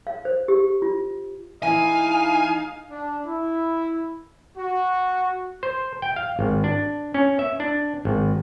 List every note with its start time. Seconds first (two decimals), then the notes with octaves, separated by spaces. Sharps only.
0.07 F5
0.25 C5
0.48 G4
0.82 F4
1.63 E3 D#4 E4 F5 G#5
2.91 D4
3.27 E4
4.58 F#4
5.63 C5
6.02 G5
6.16 F5
6.39 G#1
6.64 D4
7.14 C#4
7.39 E5
7.60 D4
8.05 G#1